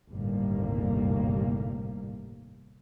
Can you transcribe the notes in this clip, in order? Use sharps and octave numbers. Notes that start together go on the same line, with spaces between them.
G1 D#2 A2 C3 G3 A#3